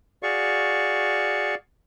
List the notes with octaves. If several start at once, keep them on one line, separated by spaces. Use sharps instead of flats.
F#4 G#4 D5 F5 C#6